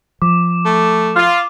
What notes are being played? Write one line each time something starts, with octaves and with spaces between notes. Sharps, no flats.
F3 D6
A3
F4